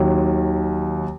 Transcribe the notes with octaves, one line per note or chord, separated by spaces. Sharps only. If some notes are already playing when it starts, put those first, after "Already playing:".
Already playing: D#2 D#3 F#3